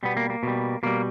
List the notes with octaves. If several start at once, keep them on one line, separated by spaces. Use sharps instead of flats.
B2 G3 B3
A#3
A#3
B2 G3
B2 G3 A#3